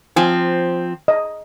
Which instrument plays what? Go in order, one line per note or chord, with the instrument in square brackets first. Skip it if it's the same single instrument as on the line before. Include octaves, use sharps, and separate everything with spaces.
[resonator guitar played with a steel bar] F3 C4 [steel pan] G#5
[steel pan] D#5